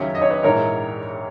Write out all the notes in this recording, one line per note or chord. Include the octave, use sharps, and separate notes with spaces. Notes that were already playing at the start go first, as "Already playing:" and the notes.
Already playing: D#2 C#3 F#3 C#4 C#5 E5
D#5
C#5
B4 D#5
A#1 G#2 E3 A#4 C#5